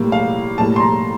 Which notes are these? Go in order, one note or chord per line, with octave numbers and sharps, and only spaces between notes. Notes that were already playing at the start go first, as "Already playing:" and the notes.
Already playing: A2 G3 A#3
F5
A2 G3 A#3 A5
C6
A#5